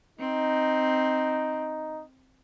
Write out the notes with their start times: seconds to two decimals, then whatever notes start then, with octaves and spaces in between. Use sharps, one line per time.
0.19 C4 D#4